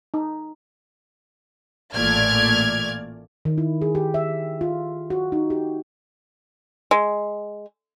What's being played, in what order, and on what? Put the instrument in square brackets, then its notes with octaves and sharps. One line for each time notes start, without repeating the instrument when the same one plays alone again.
[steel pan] D#4
[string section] A1 A#2 A3 D5 F6 G#6
[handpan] D#3
E4
G#4
G4
E5
F4
F#4
D#4
G4
[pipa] G#3